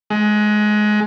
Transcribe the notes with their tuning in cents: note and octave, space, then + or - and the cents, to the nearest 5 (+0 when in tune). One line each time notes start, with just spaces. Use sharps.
G#3 +20